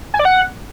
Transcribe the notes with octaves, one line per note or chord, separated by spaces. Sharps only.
G#5
D5
F#5